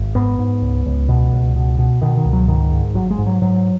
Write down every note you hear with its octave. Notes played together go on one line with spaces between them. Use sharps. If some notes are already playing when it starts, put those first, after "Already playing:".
Already playing: G#1
G#2 B3
G#2
C#2
C#2
B2
C#2
B2
B2
B2 D#3
D#3
C#2
F#3
G#2 D#3
G#2
G#1 F#3
G#3
G#2
F#3
G#2 F#3